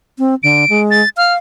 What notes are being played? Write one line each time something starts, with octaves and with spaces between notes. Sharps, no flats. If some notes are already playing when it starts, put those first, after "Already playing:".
C4
D3 D7
G#3
A6
F5 F6